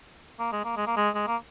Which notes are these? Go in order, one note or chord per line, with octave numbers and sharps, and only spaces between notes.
A#3
G#3
A#3
G#3
A#3
G#3
G#3
A#3